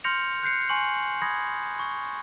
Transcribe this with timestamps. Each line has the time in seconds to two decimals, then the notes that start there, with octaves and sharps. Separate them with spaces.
0.04 C6 F6 G6 A#6 C#7 F7
0.43 F#6 G6 C7 C#7
0.69 G#5 C6 C#6 F#7
1.22 B5 D#6 G#6 A#6
1.79 C#6